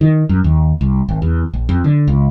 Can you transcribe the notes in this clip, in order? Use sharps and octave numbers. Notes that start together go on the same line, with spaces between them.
D#3
F#2
D#2
C2
G#1
E2
A#1
F2
D3
C#2